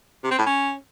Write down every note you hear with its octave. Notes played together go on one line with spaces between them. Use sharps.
C3
C4
A2
C#4